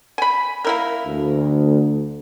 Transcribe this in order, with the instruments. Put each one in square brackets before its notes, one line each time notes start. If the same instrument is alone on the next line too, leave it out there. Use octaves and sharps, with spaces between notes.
[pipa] G#5 B5
A#3 E4 A#4
[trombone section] D2